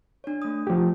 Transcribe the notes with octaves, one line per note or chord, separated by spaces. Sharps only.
D4 C#5
A3 D#6
F3 A3 G4